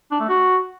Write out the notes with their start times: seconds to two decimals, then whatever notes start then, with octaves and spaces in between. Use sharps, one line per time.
0.11 D4
0.20 A3
0.28 F#4